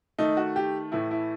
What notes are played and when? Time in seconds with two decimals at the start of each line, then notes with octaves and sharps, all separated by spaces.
0.19 D#3 A3 D#4
0.37 F#4
0.56 G4
0.92 A2 E3 A3 E4
1.11 E4